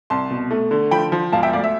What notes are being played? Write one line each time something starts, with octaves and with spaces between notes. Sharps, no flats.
C2 A5 C6
B2
A3
D3
F3 G5 B5
F3
E1 F5 A5
E5 G5
D2 D5 F5
E5